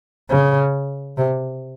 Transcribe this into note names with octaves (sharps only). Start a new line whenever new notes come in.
C#3
C3